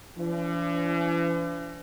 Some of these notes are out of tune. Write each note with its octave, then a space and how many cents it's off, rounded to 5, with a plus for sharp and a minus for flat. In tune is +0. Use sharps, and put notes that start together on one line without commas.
E3 +45 D4 -40